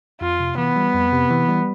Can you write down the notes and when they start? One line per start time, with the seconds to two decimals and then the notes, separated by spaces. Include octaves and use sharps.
0.21 F2 F4
0.40 C3
0.57 E3 B3
0.76 G3
0.94 F2
1.13 C3
1.31 E3
1.48 G3